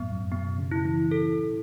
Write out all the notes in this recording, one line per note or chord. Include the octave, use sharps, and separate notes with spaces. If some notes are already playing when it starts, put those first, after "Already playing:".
Already playing: F#2 A2 B3
F#2
B2 B3
C#3
E4
E3
A4